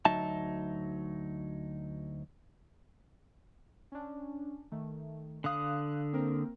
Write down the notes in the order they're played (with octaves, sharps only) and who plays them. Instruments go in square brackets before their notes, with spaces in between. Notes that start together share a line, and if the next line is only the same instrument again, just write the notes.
[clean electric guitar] D2 F#3 D#4 E5 A5
[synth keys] C#4 D4
D#3 A3
[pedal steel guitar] D3 D#6 [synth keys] F5 F#6
[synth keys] A#3 C4 A#4